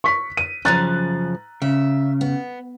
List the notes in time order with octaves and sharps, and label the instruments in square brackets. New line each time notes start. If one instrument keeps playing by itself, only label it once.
[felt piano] C#6 B6
D#7
[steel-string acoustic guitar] F#2 C#3 F3 [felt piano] A#5 F#6 A6
[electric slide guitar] C#3 [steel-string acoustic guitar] E5
[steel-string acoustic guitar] B3